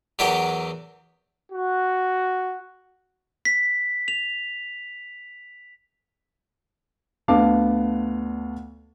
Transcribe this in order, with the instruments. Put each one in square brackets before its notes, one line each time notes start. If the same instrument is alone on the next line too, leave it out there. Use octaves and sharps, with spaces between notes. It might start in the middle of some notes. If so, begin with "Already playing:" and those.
[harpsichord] E2 E3 F#3 G4 A#4 G5
[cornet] F#4
[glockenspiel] B6
F7
[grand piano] D2 B3 D4 F5 A5 D6